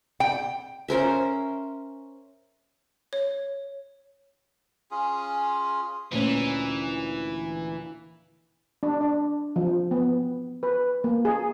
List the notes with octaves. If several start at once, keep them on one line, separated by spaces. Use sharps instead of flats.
G5
C#4 A#4 C5 E5
C#5
C#4 F4 G#4
D2 A#2 E3 C#4
D4
D4
F3
B3
B4
A#3
G#4